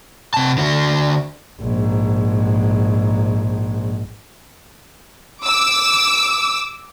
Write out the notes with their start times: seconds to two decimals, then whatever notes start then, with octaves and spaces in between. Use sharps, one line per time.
0.34 C3 A5
0.58 D3 F#4
1.61 A#1 G#2
5.44 D6 E6